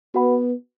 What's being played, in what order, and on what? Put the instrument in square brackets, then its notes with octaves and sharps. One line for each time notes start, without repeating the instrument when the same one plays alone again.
[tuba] B3 [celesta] F#4 B4 F#5 B5